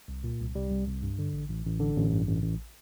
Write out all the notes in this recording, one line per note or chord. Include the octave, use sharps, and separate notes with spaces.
C2
A#2
C2
C2 G3
C2
C2
G2
D3
A1
A1
A1
D3
A1
G2
A1
A1